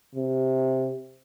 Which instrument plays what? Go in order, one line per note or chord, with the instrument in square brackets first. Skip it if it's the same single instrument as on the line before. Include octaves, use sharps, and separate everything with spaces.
[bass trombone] C3